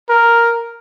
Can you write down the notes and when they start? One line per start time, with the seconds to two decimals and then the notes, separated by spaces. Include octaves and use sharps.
0.09 A#4